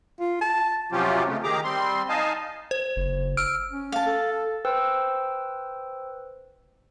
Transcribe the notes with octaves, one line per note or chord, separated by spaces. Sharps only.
F4
A5
C3 F3 F#3 C#4 F4 G4
C#3 G#3 A3
D#3 G4 G#4 A#5 D6
G3 C4 C6
D#4 D#5 F5 G#5 A5
C5
F#1
E6 F6 D7
C#4
F5 A5
A4
B4 C5 G5 E6